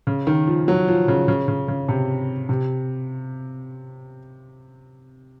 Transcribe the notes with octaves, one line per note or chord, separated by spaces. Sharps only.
C#3
D#3
F3
F#3
F3
C#3
C#3
C#3
C#3
C3
C3